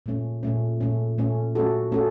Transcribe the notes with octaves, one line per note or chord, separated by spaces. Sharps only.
A#2 A3 C#4
A#2 A3 C#4
A#2 A3 C#4
A#2 A3 C#4
A3 C#4 F#4 A4
A3 C#4 F#4 A4